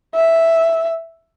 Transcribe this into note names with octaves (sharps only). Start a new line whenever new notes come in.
E5